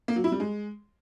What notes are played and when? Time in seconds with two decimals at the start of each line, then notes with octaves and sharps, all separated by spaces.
0.08 A#3
0.16 F#3
0.24 E4
0.32 G3
0.40 G#3